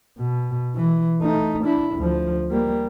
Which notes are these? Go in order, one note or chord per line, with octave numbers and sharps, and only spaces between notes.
B2
E3
A3 D#4
D4 E4
D2 F3
G3 A#3